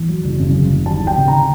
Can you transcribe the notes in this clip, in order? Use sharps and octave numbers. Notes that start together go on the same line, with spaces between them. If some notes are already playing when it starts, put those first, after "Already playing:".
Already playing: E2
F#3
F#1
C#3
F#1
F#1
D#2 A5
D#2
G5
C#3
A#5